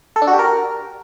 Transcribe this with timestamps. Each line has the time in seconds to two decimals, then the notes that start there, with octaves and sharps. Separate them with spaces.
0.16 A4
0.22 D4
0.27 F#4
0.33 G4
0.39 A#4